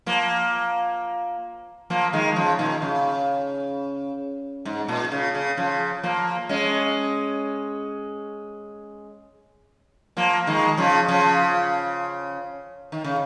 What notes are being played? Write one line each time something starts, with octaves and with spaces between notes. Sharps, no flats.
F3 A#3
F3 A#3
D#3 G#3
C#3 F3
A#2 D#3
C#3
G#2
A#2
C#3
C#3
C#3 F3
F3 A#3
G#3 C#4
F3 A#3
D#3 G#3
C#3 F3
C#3 F3
D#3
C#3